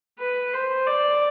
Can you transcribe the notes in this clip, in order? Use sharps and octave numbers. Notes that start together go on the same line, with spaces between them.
B4
C5
D5